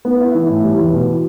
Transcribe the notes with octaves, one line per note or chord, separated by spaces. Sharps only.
B3
E4
E3
A2
G3
E2
B2